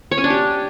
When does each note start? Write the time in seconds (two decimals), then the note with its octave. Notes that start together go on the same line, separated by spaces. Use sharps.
0.11 C#5
0.18 C#4
0.24 D4
0.30 G4